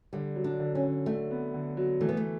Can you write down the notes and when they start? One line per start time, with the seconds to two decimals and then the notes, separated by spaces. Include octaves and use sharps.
0.13 D3 G3
0.36 F#3
0.44 D4
0.60 D3
0.75 C#4
0.83 D3
1.06 D3 A3
1.31 B3
1.54 D3
1.77 F#3
2.01 E3 A3
2.09 B3
2.17 A3